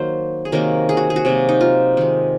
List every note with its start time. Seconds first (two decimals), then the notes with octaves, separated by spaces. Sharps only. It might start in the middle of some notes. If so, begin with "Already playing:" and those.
Already playing: D#3 F#3 A#3 C5
0.45 G#4
0.52 C3 D#3 F#3 A#3 A#4
0.89 G#4
0.97 F#4
1.10 G#4
1.16 F#4
1.25 C3 F#3 A#3
1.49 D#4
1.61 F4
1.97 D#3 G#3